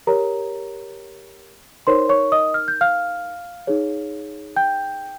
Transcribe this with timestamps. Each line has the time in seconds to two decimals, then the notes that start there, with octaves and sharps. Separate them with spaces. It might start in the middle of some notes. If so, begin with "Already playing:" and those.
0.07 G4 A#4 C#5 A#5
1.87 D#4 A#4 C5 C#5 C6
2.09 C#5 C#6
2.32 D#5 D#6
2.54 F6
2.68 G6
2.81 F5 F6
3.67 D#4 G#4 C#5
4.56 G5 G6